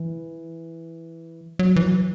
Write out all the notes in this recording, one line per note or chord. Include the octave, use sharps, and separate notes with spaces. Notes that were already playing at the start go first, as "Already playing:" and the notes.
Already playing: E3
F#3
E3
F#3